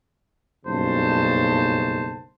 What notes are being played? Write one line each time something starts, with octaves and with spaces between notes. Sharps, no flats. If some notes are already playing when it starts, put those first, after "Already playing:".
F#1 B1 G2 C#3 C5 A5